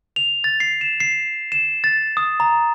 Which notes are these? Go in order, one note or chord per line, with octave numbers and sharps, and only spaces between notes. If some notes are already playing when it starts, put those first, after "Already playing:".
F7
A6
C7
E7
C7
E7
A6
D#6
A#5